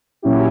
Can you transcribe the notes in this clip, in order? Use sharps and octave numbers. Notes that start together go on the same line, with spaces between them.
A#2 F#3 C#4 E4 G4